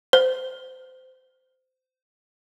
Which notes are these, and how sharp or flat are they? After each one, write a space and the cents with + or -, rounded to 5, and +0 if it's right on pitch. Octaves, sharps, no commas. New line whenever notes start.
C5 -25